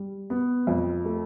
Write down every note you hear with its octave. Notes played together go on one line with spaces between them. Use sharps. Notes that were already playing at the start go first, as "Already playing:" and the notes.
Already playing: G3
B3
F2
A3